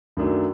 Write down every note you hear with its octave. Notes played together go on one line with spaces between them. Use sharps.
F#2 D#3 F#3 A3 D4